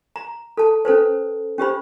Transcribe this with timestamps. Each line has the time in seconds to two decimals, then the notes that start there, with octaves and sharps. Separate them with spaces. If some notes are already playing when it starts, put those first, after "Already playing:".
0.16 A#5
0.57 A4 A5
0.85 C#4 A4 B4 C5
1.58 C#4 G4 C5 B5